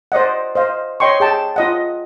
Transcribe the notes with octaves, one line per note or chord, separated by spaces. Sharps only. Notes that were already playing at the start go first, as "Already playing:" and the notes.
C5 D5 D#5 F#5
C5 D#5 F5
C#5 D#5 G5 C6 C#6
G#4 G5 A5
F4 D#5 F#5